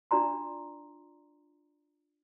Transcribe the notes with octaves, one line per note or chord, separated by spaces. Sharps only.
D4 E4 F4 D5 A#5 C6